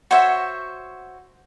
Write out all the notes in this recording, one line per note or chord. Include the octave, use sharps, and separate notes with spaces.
F#4 C5 C#5 E5